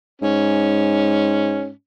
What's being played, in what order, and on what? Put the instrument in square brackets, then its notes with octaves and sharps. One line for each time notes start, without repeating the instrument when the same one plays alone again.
[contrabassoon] G#2 [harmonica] C#4